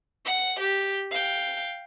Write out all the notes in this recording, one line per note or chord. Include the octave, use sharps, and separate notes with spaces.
F#5
G4
F5 G5